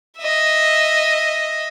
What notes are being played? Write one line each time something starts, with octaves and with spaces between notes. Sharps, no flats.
D#5 E5